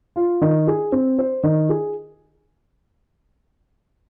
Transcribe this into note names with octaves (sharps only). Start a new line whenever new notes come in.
F4
D#3
G#4
C4
C5
D#3
G#4